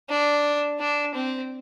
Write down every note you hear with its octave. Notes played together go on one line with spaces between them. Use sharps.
D4
D4
C4